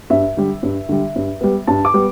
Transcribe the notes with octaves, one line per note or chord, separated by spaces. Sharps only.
G2 E5
D3 G3
G2
D3 G3
G2
G3 B3
G2 A5
D6
G3 B3